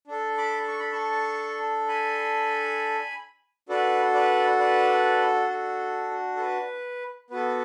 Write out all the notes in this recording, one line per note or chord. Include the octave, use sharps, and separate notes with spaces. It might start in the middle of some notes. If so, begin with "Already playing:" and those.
D4 A4
B5 D6
C#6
B5
A5 C#6
G#5 B5
D4 F#4 A4 B4 D5
B4 D5
B4 D5
A4
A4
B4
B3 F#4 A4 B4